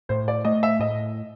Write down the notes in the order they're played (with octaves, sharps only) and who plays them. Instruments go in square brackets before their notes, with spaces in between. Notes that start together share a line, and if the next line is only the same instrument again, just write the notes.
[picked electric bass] A2 [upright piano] C5
[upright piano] D5
[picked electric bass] A3 [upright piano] D#5
[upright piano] E5
[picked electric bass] A2 [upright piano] D#5